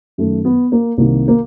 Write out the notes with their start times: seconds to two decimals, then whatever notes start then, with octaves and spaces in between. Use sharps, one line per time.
0.18 F#2 D#3 A3
0.45 B3
0.72 A#3
0.98 C2 C3 D#3 A#3
1.28 A#3